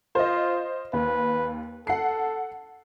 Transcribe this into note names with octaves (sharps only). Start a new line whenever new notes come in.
F4 C5 D#5
D#2 B4
A4 F#5 C7